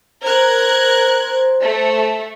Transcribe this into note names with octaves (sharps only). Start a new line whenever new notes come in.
A#4 C5 F#6 G#6
A3